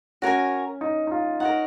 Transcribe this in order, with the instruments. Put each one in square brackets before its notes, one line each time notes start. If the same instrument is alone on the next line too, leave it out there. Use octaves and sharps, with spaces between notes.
[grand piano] C#4 [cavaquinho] F#4 A#4 C#5 G#5
[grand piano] D#4
D#4
F4
[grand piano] D#4 [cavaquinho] A#4 C#5 F#5